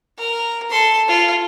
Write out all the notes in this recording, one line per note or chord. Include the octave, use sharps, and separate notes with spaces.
A#4
A4 C6
F4